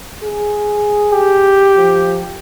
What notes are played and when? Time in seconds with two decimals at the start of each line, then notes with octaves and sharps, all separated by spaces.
0.23 G#4
1.13 G4
1.77 F3